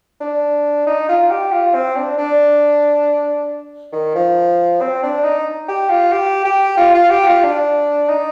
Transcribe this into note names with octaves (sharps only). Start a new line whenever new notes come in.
D4
D#4
F4
G4
F4
C4
D4
D4
D#3
F3
C4
D4
D#4
G4
F4
G4
G4
F4
F4
G4
F4
D4
D#4